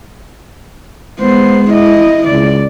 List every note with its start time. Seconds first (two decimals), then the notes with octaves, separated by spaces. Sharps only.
1.20 G#3 B3 C5
1.71 E4 D#5
2.28 C#2 D5